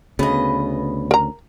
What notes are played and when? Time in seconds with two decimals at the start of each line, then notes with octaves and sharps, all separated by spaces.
0.19 D2 C#3 B3 D#5
1.11 A#4 A#5